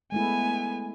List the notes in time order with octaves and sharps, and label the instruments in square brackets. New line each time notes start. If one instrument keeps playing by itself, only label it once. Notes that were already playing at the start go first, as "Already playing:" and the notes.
[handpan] G#3 A3 E4 [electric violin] B3 G#5